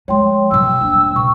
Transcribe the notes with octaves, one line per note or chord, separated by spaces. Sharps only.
F3 G#3 C#5 G5 C6
B2 F#3 G5 E6
D#1 D4
B2 C#6